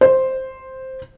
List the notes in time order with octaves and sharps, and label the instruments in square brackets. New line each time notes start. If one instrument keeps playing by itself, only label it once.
[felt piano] C5